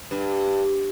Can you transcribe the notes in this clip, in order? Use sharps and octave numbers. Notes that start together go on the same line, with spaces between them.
G2